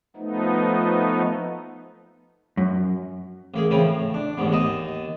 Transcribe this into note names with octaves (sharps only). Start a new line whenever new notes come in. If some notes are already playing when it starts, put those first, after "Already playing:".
F3 A3 B3 D#4
F#2
A1 A#3 G#4
C#3 E3 F3 C4
A2
D4
A1 D#2 G#2 B2
D#2 D#4 D#5 A5